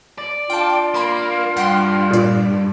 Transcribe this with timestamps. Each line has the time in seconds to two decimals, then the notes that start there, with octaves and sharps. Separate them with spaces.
0.18 D5
0.50 D4 F4 F5 G5 A5
0.94 A#3 B5 C6
1.57 G2 F#5 G5 C6
2.11 A#2 D5